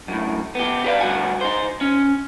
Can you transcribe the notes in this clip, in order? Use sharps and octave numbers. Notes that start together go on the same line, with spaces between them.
F#2 A2
B3 G4
G4 G#4 B4 C5 D5 F5
D2 G2 A#2 F#4 F#5 G#5
D#4 C5
C#4